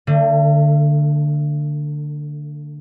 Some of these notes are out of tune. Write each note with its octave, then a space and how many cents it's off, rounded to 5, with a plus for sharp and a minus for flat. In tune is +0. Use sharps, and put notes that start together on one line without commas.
D3 +10 A3 +45